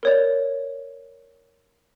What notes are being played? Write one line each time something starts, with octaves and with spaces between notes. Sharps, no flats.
A#4 C#5 D5